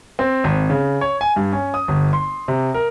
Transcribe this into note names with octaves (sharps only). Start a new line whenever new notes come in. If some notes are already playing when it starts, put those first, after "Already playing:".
C4
G#1
C#3
C#5
G#5
G2
C#4
D#6
G1
C6
C3
A#4